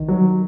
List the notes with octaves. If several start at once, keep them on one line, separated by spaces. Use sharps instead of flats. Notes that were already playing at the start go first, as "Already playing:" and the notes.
Already playing: D#3
F#3